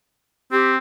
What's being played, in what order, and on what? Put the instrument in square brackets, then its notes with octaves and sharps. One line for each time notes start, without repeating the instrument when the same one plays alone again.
[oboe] C4 [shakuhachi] G4